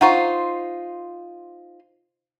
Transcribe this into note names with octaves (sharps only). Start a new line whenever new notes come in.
D#4 F4 C5 F#5 A#5 C#6